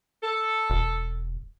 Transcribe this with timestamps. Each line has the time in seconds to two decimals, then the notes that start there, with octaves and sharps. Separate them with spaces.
0.23 A4
0.70 E1